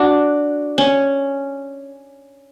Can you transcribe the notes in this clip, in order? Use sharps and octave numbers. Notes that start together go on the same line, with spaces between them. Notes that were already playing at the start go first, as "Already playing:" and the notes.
Already playing: D4 F#4
C#4